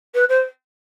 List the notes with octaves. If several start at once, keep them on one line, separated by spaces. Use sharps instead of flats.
B4
C5